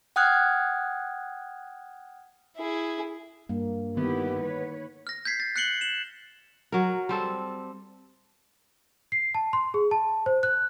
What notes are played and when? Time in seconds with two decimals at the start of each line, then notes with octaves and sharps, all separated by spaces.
0.16 F#5 G5 D#6 F6 F#6 G#6
2.57 E4 G#4
3.49 G2 A#3
3.97 D3 D#3 B3 E4 G4
4.42 B4 C#5
5.07 F6 A#6
5.25 G6 G#6 B6 C7
5.40 A6
5.56 F#6 C7 C#7 F#7 G7
5.81 E7 F#7
6.72 F#3 A#4
7.09 G3 C4 A4
9.12 C7
9.34 A5
9.53 C6
9.74 G#4
9.91 A5
10.26 C5
10.43 F#6